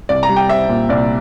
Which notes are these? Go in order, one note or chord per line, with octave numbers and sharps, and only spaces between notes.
C2 D5
A#5
G3
G5
C4 E5
A#2
C2 D5